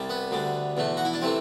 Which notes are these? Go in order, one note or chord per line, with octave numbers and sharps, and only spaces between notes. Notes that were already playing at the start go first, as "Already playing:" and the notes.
Already playing: C2 C3 G3
B3
D2 D3 G3
E2 B2 A3
F#4
E4
D4
C3 E3 A3 C4